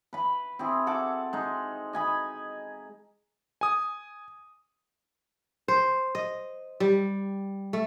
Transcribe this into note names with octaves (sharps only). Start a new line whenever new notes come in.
B4 B5
C4 E4 G#4
A4 F#5 D6
G#3 D#4
D#5 G#5 B5
G#5 D#6
C5
D#5
G3
A3